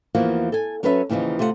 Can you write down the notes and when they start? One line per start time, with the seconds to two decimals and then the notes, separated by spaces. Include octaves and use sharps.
0.15 E2 E3 F3 A#3 F#4
0.52 A4 G#5
0.83 F#3 C#4 A4 B4 C#5 E5
1.09 D#2 C#3 E3 F3 D#4
1.39 C3 A3 F4 G#4 F#5